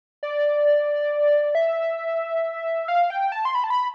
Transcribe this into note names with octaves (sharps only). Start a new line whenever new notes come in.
D5
E5
F5
G5
A5
C6
B5
A5
B5